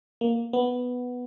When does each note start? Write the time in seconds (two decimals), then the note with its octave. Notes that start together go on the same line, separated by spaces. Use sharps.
0.21 A#3
0.53 B3